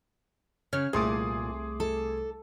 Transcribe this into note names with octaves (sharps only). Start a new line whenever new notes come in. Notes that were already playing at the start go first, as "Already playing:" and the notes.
C#3 C#5 F6
C2 A#2 A3 G#4 C6 D6 D#6
A4